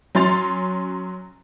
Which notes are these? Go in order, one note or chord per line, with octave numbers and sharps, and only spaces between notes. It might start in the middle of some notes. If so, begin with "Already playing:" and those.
F#3 C#4 C6 A6 F7